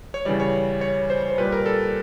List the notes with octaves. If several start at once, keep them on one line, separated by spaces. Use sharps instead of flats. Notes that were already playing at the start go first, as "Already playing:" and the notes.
C#5
C#3 E3 G3 D5
C#5
C#5
C5
C5
A#2 G3 B4
A#4
A4